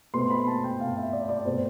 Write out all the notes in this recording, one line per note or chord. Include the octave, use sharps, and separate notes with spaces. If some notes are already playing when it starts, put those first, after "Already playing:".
B2 A3 C4 C6
B5
A5
G5
B2 A3 C4 F5
E5
D5
D5
B2 A3 C4 C5